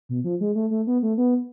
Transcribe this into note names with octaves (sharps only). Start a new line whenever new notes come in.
B2
F3
G#3
A3
A3
B3
A3
B3